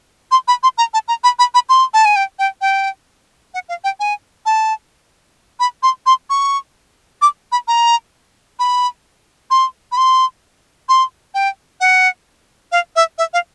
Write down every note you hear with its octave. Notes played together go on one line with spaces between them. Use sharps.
C6
B5
C6
A#5
A5
A#5
B5
B5
B5
C6
A5
G#5
G5
G5
G5
F#5
F5
G5
G#5
A5
B5
C6
C6
C#6
D6
B5
A#5
B5
C6
B5
C6
C6
G5
F#5
F5
E5
E5
F5